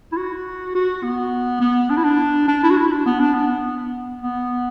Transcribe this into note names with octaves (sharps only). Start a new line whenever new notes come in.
E4
F#4
F#4
B3
B3
D4
E4
D4
D4
E4
F#4
E4
D4
B3
D4
B3
B3